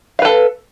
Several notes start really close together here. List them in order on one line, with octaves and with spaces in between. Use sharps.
F5 B4 A4